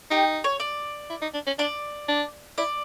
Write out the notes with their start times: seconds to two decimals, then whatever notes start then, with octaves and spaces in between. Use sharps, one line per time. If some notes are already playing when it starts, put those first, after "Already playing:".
0.11 D#4 G4
0.44 C#5
0.60 D5
1.10 E4
1.22 D#4
1.34 D4
1.47 C#4
1.59 D4 D5
2.08 D4
2.58 E4 D5